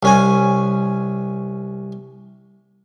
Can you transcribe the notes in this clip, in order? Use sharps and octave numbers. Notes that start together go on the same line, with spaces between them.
C2 C#4 G#5